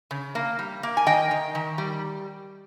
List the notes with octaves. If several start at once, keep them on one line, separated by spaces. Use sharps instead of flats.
C#3
A#3
G3
A#3
G#5
D#3 D#5 G5
D#3
D#3
G3